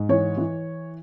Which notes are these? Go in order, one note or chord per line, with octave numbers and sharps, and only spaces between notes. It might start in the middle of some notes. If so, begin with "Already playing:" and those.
Already playing: G#2
E3 C#5
E3